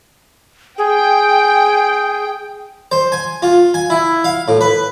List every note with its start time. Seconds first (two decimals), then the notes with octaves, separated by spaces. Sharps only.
0.78 G#4 G5
2.92 C5
3.12 G#5
3.42 F4
3.74 G#5
3.90 E4
4.24 F5
4.48 A2
4.61 B4